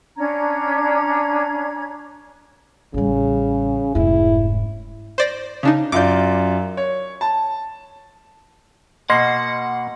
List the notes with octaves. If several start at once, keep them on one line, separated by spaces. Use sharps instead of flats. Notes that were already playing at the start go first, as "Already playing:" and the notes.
C#4 D4 A#5 G#6
A1 C#3 G3
F1 G#2 E4
C5 D5 A#6
C#3 D4 D#4
F#2 F4 D5 D6 G6
C#5
A5
B2 A#3 D#5 F#5 C6